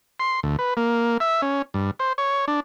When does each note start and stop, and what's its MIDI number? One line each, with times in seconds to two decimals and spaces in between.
0.20 0.40 84
0.43 0.56 38
0.59 0.74 71
0.77 1.17 58
1.20 1.41 76
1.42 1.62 61
1.74 1.91 43
1.99 2.13 72
2.18 2.45 73
2.48 2.60 62